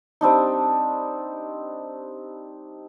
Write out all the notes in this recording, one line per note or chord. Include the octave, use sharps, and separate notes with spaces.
G3 C4 D4 D#4